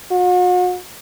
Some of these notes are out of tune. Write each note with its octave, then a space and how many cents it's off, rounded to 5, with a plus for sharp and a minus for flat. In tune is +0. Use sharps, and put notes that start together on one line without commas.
F#4 -40